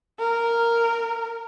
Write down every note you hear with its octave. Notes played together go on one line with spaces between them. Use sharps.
A#4